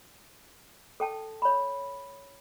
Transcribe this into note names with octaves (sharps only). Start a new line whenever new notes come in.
A4 G5 A5
C#5 B5